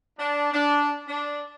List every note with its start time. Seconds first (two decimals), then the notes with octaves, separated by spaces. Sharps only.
0.19 D4
0.53 D4
1.08 D4